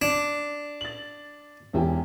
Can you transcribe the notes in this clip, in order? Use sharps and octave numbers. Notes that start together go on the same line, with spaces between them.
D4
A6 F#7
E1 E2 G4